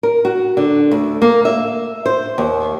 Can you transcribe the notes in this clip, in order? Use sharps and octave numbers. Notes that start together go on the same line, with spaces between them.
A#4
F#4
D3
D2
A#3
E5
C5
D#2